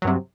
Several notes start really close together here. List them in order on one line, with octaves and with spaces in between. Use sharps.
F#3 G2 C3